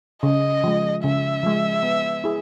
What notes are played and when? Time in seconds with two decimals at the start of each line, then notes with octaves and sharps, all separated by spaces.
0.23 C#3 D#5
0.64 F3 G#3
1.04 C#3 E5
1.43 F3 G#3
1.83 B3
2.24 E4 G#4